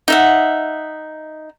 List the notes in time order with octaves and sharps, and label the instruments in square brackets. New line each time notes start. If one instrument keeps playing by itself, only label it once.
[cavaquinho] D#4 E5 F#5